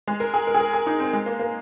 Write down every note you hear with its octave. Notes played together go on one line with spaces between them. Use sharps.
G#3
A#4
G#4
A#4
G#4
A#4
G#4
D#4
C4
G#3
A#3
A#3